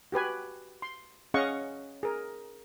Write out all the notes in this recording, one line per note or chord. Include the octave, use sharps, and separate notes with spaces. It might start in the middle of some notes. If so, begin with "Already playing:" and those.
F#4 G4 B4 G#5
C6
C#4 G#4 D#5 F5 F#5 C#6
G#4 A#4